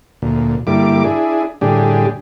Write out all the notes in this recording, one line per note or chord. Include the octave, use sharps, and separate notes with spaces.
D2 A#2
G2 D3 G3 A#3 E4 D6
D4 E4 G#4
A2 D3 G3 D4 G4 G#4